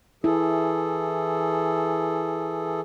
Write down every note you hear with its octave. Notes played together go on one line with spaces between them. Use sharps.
E3 E4 G#4 A4